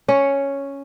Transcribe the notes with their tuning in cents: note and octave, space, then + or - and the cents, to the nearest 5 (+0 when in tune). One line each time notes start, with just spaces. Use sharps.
C#4 +0 C#5 +0